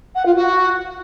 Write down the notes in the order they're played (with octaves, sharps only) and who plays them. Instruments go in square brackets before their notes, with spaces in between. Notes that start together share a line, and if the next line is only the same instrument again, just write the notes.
[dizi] F#5
F4
F#4